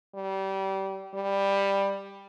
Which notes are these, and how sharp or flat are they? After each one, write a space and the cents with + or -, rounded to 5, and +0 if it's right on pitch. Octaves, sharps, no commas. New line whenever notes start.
G3 -25
G3 +10